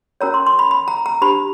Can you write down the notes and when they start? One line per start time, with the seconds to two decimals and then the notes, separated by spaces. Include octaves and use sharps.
0.21 C#4 F#4 A#4 C#5 A#5
0.34 C6
0.46 C6
0.59 B5
0.71 B5
0.88 A#5
1.06 A#5
1.22 D4 G4 C5 B5